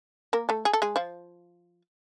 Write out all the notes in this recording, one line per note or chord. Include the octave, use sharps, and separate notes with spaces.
A#3 A#4
A3 A4
G#4
A4
G#3 G#4
F3 F4